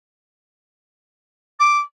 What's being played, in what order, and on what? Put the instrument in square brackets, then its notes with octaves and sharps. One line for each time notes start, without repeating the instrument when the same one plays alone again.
[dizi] D6